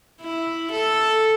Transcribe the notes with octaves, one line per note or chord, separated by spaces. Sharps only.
E4
A4